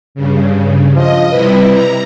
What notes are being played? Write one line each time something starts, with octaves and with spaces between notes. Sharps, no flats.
G2 C#3
F3 D#5
C3 G3 E4 B4
A#5